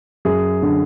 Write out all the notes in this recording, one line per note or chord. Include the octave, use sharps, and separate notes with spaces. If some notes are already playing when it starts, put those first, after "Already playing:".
F#2 G#4
D3